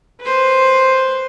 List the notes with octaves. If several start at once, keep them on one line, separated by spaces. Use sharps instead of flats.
B4 C5